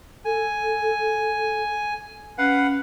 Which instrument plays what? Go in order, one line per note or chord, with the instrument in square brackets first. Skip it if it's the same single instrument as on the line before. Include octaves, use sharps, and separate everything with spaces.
[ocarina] A4 [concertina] G#5
[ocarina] C#4 [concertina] B4 F5 F#5